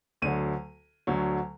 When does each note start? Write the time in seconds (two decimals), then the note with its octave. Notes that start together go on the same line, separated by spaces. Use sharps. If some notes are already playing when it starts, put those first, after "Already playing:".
0.22 D2 D3 F#3 D#7
1.07 D2 D3 F#3